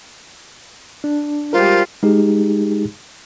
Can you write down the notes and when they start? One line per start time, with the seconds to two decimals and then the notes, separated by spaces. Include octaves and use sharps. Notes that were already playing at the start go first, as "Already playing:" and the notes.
1.04 D4
1.53 G3 G#3 F4 G4 A#4 C5
2.03 G#3 D#4 G4 G#4